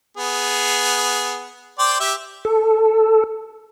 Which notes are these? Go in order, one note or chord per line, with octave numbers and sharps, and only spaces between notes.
B3 G#4
C5 D5 G5
G4 E5
A4